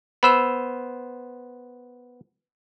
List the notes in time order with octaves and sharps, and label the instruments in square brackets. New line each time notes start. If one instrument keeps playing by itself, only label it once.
[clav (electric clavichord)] B3 C5 [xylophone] B5 E6 E7